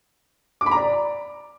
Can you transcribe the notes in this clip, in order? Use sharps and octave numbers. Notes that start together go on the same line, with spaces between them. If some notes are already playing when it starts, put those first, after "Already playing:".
D6
B5
A#5
D5